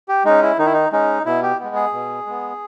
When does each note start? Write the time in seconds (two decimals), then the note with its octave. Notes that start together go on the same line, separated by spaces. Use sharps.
0.08 G4
0.25 G#3 C#4 D#4
0.42 E4
0.58 D#3 D#4
0.66 E4
0.74 D#4
0.92 G#3 C#4 D#4
1.26 B2 E4
1.42 G4
1.59 G#3 B3
1.76 G#4
1.93 B2
2.26 G#3 B3